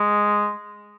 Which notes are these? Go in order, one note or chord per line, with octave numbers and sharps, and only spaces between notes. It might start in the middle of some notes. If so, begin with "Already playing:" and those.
Already playing: G#3